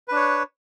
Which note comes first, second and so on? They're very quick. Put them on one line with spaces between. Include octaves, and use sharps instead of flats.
B4 D4 C#5